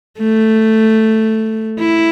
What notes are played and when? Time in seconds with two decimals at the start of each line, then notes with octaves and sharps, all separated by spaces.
0.18 A3
1.80 E4